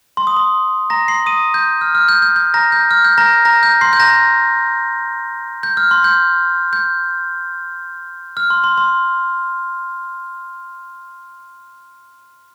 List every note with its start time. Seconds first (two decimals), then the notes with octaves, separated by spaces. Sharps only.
0.17 C6
0.27 D#6
0.37 C6
0.90 A#5 A#6
1.08 C6 C7
1.26 D#6 D#7
1.54 G6
1.81 F6
1.95 F6
2.08 G6
2.22 G6
2.36 G6
2.54 A#5 A#6
2.72 G6
2.91 F6
3.04 G6
3.18 A#5 A#6
3.45 A#5 A#6
3.63 G6
3.81 C6 C7
3.93 G6
4.00 A#5 A#6
5.63 G6
5.77 F6
5.91 C6
6.04 G6
6.73 G6
8.37 F6
8.50 C6
8.64 C6
8.78 C6